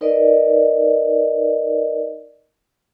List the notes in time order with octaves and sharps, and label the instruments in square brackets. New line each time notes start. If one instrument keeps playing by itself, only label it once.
[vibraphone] D#4 A#4 B4 D5 D#5